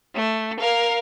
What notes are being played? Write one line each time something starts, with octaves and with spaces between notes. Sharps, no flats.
A3
A#4 F5